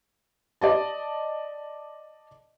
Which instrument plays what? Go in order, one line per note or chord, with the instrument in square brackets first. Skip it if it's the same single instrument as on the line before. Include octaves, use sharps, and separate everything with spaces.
[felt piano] D5 D#5 A5